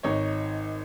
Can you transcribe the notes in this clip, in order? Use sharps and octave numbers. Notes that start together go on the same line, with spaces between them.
G#1 D#4 C#5